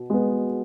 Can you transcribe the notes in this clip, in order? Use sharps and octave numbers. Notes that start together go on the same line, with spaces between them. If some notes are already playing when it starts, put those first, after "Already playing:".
Already playing: B2
G#3 B3